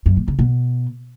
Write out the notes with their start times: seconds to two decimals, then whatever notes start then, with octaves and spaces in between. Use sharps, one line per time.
0.06 F#2
0.17 A#2
0.28 C#3
0.39 B2